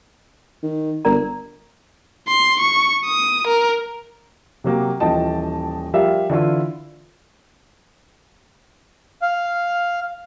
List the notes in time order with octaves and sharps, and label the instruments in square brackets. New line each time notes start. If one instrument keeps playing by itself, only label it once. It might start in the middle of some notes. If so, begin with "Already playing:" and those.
[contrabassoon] D#3
[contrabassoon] G1 [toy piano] A#4 D5 A#5
[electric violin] C6
C#6
D#6
A#4
[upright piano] C3 F#3 A#3 G4
D#1 E3 F3 D#5 G5 A5
F3 G3 G4 A#4 E5 F5
D3 E3 E4 F4
[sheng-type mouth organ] F5